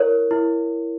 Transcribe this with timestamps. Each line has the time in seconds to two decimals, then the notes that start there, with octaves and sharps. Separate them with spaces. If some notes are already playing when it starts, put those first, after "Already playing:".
Already playing: E4 A#4 C#5
0.31 E4